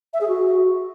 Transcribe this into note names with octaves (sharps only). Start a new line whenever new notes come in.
E5
G#4
F#4